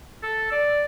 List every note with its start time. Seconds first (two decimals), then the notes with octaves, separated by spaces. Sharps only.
0.23 A4
0.52 D5